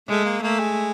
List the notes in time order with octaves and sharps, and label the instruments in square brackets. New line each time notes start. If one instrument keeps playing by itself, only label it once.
[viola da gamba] G#3 [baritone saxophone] A3
[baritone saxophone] A#3
[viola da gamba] A3 [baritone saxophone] A#3
[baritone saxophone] G#3